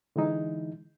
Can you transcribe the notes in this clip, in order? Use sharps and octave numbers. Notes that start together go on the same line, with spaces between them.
D3 E3 G#3 D#4 E4